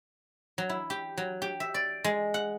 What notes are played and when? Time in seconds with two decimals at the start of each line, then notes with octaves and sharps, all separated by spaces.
0.58 F#3
0.70 E4
0.90 G4
1.17 F#3
1.42 G4
1.60 E5
1.74 D5
2.04 G#3
2.34 F#5